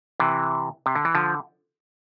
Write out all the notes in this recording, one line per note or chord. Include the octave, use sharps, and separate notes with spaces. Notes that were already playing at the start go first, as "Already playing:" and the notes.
C3 E3
C3
D3
E3
D3 F3